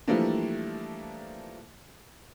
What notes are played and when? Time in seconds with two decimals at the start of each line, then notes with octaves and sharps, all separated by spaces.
0.08 E3 F3 G3 A3 A#3 D4